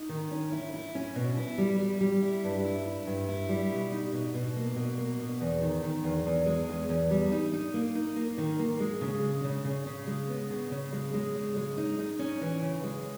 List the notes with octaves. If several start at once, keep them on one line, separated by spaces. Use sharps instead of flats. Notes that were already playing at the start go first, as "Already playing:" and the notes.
Already playing: D#4
D#3
C#4
E4
E4
C#4
B2
E4
G3
G3
G3
E4
G2
E4
E4
G2
E4
G3
B2
D#4
B2
B2
A#3
B2
A#3
B2
E2
D#3
D#3
E2
E2
G#3
E2
E2
G3
D#4
D#4
A#3
D#4
A#3
D#3
A#3
G#3
C#3
G#3
C#3
C#3
C#3
G#3
B3
C#3
C#3
G#3
G#3
C#3
G#3
D#4
D#4
C#4
E3
C#3
G#3